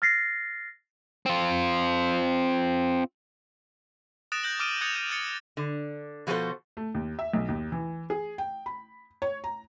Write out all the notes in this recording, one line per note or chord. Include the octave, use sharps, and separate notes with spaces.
F6 A6 A#6 C7
C4 F4
D#6 F#6 A6 A#6 D7 E7
F#6 G6 A#6 F#7
D6 F6 D7 D#7
D#6 F#6 G#6 A6 C#7 F7
G6 D#7
F6 A6 C#7 D7
D3
B2 F3 F#4 G#4 A4 C5
A3
D#2
E5
B1
D#2
E3
G#4
G5
B5
C#5
A#5